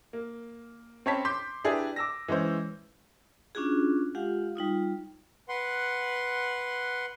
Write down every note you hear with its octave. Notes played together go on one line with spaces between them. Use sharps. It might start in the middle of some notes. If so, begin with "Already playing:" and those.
A#3
C4 C#4 C#5 A5 B5 B6
C6 D6 G6 B6
D4 E4 G4 G#4 B4 D5
D6 E6 A#6
E3 G#3 C#4 C5
C#4 D4 F4 F#4 G#4
G#3 F4 G4 F5 F#5
G3 D#4 F4 D#6
B4 F#5 C6